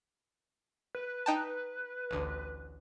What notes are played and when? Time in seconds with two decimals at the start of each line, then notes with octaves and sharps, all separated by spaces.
0.95 B4
1.26 D#4 G5 A5
2.11 A1 D2